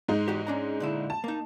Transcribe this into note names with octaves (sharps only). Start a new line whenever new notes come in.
G#2 G#3 D#4
E2 F#4 G4
C#4 D4 A#5
A#2 D3 E4
A5
A#3 D#4